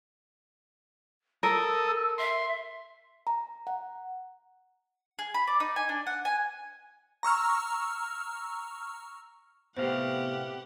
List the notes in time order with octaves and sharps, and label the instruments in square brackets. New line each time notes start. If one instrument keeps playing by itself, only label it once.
[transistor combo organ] A4 D#6 [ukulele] A#4 [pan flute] E6
[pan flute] E5 [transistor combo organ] C6
[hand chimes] A#5
F#5
[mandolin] G#4
B5
D5
D#4
G#5
D4
F#5
G#5
[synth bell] A#5 C#6 E6 F6
[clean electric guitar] A2 C3 F5 [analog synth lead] B3 [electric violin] G4 F#5 [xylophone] C5